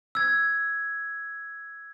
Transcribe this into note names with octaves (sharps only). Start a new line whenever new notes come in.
E6 G#6